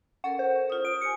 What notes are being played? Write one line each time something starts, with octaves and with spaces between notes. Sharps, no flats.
C#4 A4 A#4 F#5
C5
F4 D#6
D7
G4 G#5 C#7